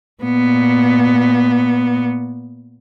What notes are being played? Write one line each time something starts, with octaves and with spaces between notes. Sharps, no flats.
A#2 B3